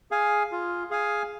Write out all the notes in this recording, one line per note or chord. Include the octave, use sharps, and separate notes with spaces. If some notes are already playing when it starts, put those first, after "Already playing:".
G#4 F5 G#5
F4
G#4 F5 G#5